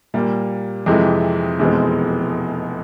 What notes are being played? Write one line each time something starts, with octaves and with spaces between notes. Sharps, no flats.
A#2 G3 A#3
F2 C3 E3 G#3
F1 E2 B2 G#3 C4